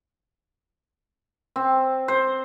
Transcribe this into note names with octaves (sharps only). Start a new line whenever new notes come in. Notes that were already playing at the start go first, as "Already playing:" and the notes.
C4
C5